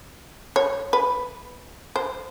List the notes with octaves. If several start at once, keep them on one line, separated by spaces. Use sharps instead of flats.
C#5
B4
C5